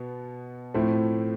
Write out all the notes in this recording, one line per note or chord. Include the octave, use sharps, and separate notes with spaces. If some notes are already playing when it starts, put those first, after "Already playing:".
Already playing: B2 B3
A2 F3 A3 C4 E4